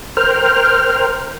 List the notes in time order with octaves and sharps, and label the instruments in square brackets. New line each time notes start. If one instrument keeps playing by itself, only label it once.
[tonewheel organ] A#4 C5 G5 F6